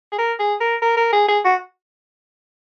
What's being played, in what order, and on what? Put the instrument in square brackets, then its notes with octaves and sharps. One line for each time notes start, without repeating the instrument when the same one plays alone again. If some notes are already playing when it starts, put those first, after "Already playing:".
[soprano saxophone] G#4
A#4
G#4
A#4
A#4
A#4
G#4
G#4
F#4